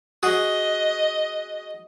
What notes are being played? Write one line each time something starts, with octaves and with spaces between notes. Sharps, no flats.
F#4 G#4 D#5